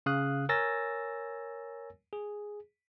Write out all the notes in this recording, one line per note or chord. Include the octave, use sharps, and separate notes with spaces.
C#3 F5 D#6 F#6
A#4 C#5 G#5 E6 A6 A#6
G#4